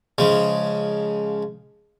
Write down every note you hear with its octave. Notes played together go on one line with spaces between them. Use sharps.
C#3 F3 G#3